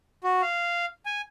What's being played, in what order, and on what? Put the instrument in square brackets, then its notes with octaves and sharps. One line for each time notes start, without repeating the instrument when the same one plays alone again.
[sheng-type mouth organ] F#4
F5
G#5